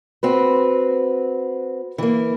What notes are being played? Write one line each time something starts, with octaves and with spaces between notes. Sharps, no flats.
C4 F#4 B4
E3 A#3